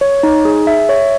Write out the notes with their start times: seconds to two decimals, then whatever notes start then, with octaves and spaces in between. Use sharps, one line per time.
0.01 C#5
0.23 D#4
0.45 G#4
0.67 E5
0.89 C#5